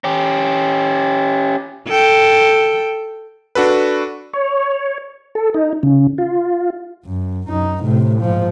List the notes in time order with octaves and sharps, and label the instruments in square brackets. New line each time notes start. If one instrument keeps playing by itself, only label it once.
[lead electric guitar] C#4 G4
[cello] A4 G5
[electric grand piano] D4 F#4 A4 B4
[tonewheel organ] C#5
A4
D#4
C#3
F4
[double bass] F#2
F#2 D#4
A2 C3
G#2 F3